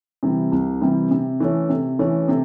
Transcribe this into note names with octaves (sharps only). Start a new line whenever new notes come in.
C3 E3 G3
C2
C3 E3 G3
C3
E3 A3 C#4
C3
E3 A3 C#4
C3